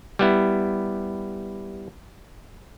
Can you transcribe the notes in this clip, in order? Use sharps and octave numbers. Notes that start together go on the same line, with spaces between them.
G3 B3 E4